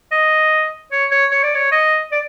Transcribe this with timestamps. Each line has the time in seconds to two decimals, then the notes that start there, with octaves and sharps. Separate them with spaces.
0.11 D#5
0.92 C#5
1.11 C#5
1.31 C#5
1.43 D5
1.55 C#5
1.72 D#5
2.12 D5